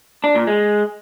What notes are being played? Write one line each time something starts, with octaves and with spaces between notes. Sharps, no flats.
D4
A#2
G#3